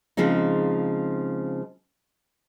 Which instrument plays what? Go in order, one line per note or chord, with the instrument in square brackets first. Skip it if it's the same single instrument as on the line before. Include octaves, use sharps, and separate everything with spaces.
[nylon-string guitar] C#3 F3 G#3 C4 D#4